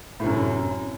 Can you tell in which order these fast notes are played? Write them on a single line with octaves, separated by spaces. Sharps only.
A2 C3 F#2